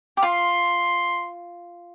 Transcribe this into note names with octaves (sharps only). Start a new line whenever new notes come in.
G4
F4 C6